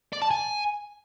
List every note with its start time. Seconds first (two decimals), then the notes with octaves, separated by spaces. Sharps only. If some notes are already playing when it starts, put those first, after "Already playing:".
0.13 D5
0.22 A5
0.31 G#5